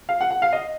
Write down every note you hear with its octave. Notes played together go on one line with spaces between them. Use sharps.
F5
F#5
F#5
F5
D#5